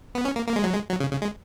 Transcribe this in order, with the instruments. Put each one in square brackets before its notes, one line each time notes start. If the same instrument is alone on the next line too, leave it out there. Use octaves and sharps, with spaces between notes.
[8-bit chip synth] B3
C#4
A#3
A#3
G#3
F#3
G#3
F#3
C#3
C#3
G#3